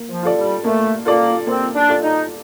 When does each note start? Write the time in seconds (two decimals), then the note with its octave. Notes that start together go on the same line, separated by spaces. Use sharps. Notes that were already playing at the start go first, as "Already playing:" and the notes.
Already playing: A#3
0.09 F3
0.23 F4 A4 D5
0.36 G3
0.64 A3 A#3
1.05 A#3 F4 A4 D5
1.47 A#3 C4
1.74 D4
1.88 F4 A4 D5
2.02 D#4